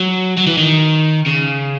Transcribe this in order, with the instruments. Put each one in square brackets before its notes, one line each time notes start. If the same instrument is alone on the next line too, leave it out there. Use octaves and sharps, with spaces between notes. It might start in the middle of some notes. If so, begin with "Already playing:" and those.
Already playing: [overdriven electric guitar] F#3
F#3
E3
D#3
C#3